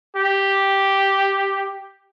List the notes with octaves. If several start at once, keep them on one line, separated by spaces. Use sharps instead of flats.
G4